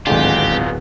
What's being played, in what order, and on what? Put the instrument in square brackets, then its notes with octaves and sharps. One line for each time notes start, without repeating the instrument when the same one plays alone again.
[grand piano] D1 G#4 [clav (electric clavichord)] G#1 D3 [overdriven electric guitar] B3 F4 [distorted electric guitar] G4